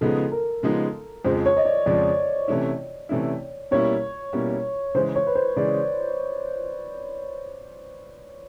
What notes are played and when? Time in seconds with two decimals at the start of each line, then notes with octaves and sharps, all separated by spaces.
0.01 C#3 F3 G#3 B3 D#4 A4
0.32 A#4
0.63 C#3 F3 G#3 B3 D#4
1.25 F2 C#3 F3 G#3 C5
1.46 C#5
1.57 D#5
1.65 D5
1.86 F2 C#3 F3 G#3 D5
2.48 C3 E3 A3 C#4 E4
3.09 C3 E3 A3 C#4 E4
3.71 B2 G3 A#3 C#4 E4 C#5
4.33 B2 G3 A#3 C#4 E4
4.95 C#3 E3 G#3 C5
5.16 C#5
5.27 B4
5.35 C5
5.56 C#3 E3 G#3 D5